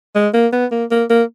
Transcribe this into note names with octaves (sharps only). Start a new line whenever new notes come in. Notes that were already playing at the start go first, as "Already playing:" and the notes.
G#3
A#3
B3
A#3
A#3
A#3